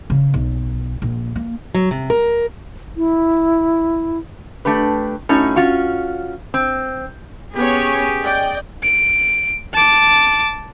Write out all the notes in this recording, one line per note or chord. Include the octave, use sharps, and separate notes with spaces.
C#3
B1
A#1
A#3
F#3
C3
A#4
E4
A3 D4 G4 B4
A2 C#4 D#4 F#4
C#4 F4 F#4
C4
B3 C#4 G4 G#4 C#5
D5 D#5 G5
D7
A5 D6